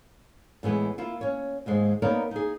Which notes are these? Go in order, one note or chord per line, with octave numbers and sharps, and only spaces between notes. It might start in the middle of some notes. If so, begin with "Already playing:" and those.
A2 E3 G#3 B3 E4
A#3 E4 F4
C#4 C#5
D#2 G#2 G#3 C5
A#3 B3 D#4 A#4 C#5 D5
D#4 G#4